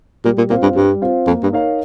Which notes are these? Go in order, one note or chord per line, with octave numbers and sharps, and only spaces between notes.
A#2 G3
A#2
A#2 C4 F4 C5 F5
G2
G2 G3
C4 F4 C5 F5
F2 A#3
G2
D#4 A#4 C#5 F5